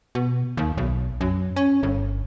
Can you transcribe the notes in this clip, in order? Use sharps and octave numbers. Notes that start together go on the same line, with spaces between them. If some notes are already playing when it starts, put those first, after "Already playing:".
B2
D#2
B1
F#2
C#4
G1